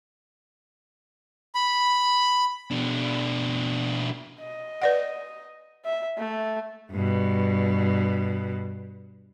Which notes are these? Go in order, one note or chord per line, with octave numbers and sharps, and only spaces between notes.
B5
B2 D4
D#5
B4 D5 F#5
E5
A3
G2 B2